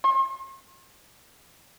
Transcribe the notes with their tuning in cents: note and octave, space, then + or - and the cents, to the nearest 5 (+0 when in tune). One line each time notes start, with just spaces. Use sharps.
C6 +40